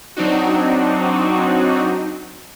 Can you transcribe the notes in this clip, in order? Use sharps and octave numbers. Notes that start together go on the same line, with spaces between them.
F#3 C4 D4 D#4 F#4